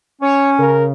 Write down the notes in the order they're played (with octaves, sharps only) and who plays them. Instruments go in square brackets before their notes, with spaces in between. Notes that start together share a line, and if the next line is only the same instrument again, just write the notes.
[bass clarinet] C#4 [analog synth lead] C#5
[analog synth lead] C#3 [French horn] A#4